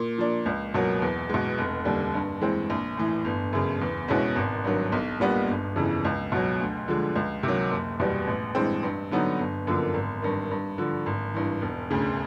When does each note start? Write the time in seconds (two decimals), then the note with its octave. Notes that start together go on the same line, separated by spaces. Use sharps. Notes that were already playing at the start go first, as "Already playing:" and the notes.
Already playing: A#2
0.18 F3 A#3 D4
0.46 C#2
0.74 B2 F#3 A#3
1.02 E2
1.29 B2 G#3
1.58 F1
1.85 D#2 D3 G3
2.14 G2
2.41 E3 G#3 C4
2.70 A#1
2.97 A2 E3
3.25 G1
3.53 F#2 C#3
3.81 E2
4.08 B2 G#3 C#4 E4
4.36 G#1
4.64 G2 D#3 F#3
4.92 B1
5.20 A#2 G3 B3 D4
5.48 G1
5.76 F2 C#3 E3
6.05 C#2
6.32 B2 F#3
6.60 D2
6.88 D3 F3 G#3
7.16 C#2
7.43 C3 D#3 F#3
7.71 F#1
7.99 E2 B2 G3
8.27 A1
8.55 G2 E3 G#3 C4
8.83 G2
9.11 D3 F#3 B3 D#4
9.39 G1
9.67 F#2 D3 F3 A#3
9.94 G#1
10.22 G2 D#3
10.51 G2
10.78 D3 F3
11.06 G#1
11.34 G2 E3
11.62 E1
11.91 D2 C#3